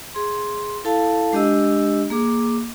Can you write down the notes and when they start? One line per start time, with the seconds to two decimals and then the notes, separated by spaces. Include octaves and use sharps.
0.14 G#4 C6
0.84 E4 A4 F5 A5
1.33 G#3 D4 G4 D#5 E6
2.10 A#3 G#4 D6